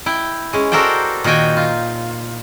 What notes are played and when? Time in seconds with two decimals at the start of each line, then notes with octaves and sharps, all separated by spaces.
0.06 E4 G5
0.53 G#3 C#4
0.72 F#4 A4 A#4 C5 D5 G5
1.24 A#2 D#3 D#4 F#4 G5 G#5
1.57 F4